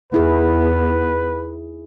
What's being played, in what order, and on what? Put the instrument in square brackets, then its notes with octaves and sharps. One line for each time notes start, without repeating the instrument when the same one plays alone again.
[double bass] E2 B3 [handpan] D#4 E4 G#4 [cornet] B4